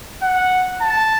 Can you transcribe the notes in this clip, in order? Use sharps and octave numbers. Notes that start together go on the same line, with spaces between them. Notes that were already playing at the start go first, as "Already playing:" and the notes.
F#5
A5